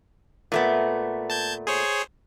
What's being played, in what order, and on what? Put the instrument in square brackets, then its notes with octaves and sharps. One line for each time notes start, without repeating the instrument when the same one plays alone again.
[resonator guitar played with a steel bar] A#2 A3 B3
[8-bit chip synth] A5 G6 G#6
G#4 C5 C#5